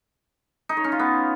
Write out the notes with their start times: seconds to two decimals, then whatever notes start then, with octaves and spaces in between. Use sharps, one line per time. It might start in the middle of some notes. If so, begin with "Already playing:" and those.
0.69 D#4
0.77 C#5
0.84 C#4
0.92 F4
0.99 B3